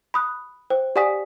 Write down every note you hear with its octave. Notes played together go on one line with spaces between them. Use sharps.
B5 D#6 F#6
C5 G5
G4 D5 F#5 G#5 D#6 B6